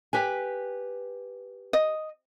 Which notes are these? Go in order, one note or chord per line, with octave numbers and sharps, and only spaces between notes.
G4 B4 G#5
D#5